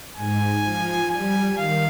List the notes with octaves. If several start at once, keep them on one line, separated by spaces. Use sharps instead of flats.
G#2 G#5
F3
G3 G#5
D#3 F5